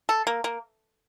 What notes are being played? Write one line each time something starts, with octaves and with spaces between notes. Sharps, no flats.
A4
A#3
A#3